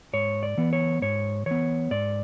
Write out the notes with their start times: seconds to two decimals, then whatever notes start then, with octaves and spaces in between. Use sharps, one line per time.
0.13 G#2 C#5
0.43 D5
0.57 E3 B3
0.73 C#5
1.02 G#2 C#5
1.46 E3 B3 C#5
1.91 G#2 D5